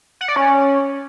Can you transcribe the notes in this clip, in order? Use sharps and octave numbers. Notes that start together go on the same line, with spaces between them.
F#5
D5
C#4